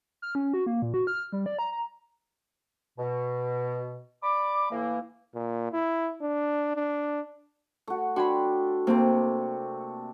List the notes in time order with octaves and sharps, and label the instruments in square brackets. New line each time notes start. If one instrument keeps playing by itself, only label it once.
[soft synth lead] F6
C#4
F#4
A#3
A#2
F#4
F6
G3
D5
A#5
A#5
[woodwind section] B2
D5 B5 D6
A2 E3 A#3
[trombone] A#2
E4
D4
D4
[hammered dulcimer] A3 F#4
[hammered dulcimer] D4 G5 C6 [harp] F#4 C#5 B5
[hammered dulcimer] C3 A3 [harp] A#3 C4